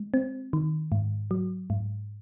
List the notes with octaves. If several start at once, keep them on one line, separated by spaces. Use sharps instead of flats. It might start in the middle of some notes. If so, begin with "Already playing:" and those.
Already playing: G#3
C4
D#3
G#2
F#3
G#2